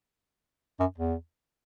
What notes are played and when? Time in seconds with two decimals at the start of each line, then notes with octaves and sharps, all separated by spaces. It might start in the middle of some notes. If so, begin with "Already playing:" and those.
0.79 F#2
0.98 E2